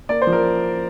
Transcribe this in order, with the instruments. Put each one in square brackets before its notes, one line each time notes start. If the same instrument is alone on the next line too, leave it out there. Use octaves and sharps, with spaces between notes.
[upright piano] A#3 D5
C5
F3
A#4